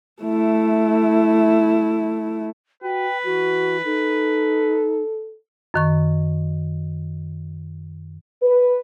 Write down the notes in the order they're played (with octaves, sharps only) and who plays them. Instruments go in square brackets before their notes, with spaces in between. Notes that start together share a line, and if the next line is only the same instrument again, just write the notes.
[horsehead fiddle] A3 E4
[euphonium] F#4 [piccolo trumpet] B4 [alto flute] G5
[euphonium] E3 [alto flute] F#4
[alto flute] D#4 [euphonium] A4
[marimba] F#2 D#3 C#6
[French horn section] B4